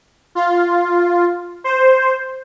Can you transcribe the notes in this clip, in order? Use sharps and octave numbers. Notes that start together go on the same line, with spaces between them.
F4
C5